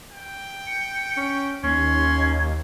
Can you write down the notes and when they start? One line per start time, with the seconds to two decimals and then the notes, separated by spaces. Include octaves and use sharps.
0.12 G5
0.67 C#7
1.17 C#4
1.63 D#2 C#4 C6 G#6